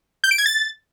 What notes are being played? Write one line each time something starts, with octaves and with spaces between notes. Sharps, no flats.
G6
D7
G#6
A6